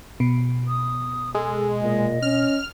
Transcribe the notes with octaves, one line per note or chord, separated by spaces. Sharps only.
B2
D#6
G#3 A4
A#2 D#5
C#4 F6